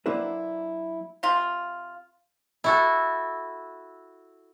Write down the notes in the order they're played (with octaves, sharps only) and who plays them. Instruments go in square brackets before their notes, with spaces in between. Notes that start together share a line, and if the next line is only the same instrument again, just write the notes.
[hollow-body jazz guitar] F#3 A#3 D4 E4 B4 C5
[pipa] C3 F4
[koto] E4 F#4 A4